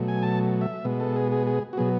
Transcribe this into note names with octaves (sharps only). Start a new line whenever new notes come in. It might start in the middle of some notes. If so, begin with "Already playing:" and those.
Already playing: B2 F#3 A3
G#5
A5
E5
B2 G#3 B3
A4
G#4
G#4
G#4
F#4
B2 F#3 B3 G#4